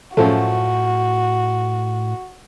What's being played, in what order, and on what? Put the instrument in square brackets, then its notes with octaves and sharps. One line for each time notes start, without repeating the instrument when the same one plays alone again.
[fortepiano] F#2 F3 A3 [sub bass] A2 [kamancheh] F#4